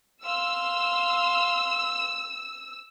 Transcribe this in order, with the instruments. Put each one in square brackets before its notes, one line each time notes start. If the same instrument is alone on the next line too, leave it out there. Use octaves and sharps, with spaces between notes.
[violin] F5 C6 [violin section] E6